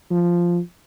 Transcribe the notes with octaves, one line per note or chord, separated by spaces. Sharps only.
F3